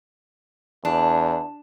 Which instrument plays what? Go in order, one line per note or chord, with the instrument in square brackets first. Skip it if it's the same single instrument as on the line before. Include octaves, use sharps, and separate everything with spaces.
[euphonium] E2 [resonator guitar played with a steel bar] D4